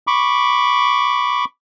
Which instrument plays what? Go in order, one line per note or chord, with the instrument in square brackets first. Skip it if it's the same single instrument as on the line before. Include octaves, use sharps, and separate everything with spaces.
[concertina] B5 C#6 D6